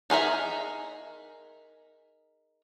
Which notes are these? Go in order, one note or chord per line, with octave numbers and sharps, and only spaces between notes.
D#4 G#4 A#4 E5